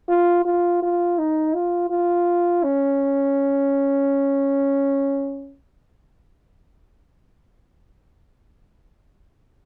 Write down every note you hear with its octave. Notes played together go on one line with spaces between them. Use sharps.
F4
F4
F4
D#4
F4
F4
C#4